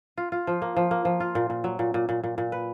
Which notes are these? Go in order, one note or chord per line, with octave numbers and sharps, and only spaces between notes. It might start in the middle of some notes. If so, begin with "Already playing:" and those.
F4
F4
F3
A#3
F3
A#3
F3
F4
A#2
A#2
F#3
A#2
A#2
A#2
A#2
A#2
B4